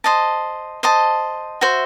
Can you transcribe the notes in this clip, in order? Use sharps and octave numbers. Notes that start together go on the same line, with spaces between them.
C5 D#5 A5
C5 D#5 A5
F#4 C5 E5